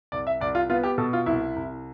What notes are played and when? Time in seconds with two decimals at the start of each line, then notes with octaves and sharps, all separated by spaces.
0.12 C2 D5
0.27 E5
0.41 C2 D5
0.55 F4
0.70 B3 F4
0.84 G4
0.98 B2 A4
1.13 F4
1.26 C2 E4
1.56 C2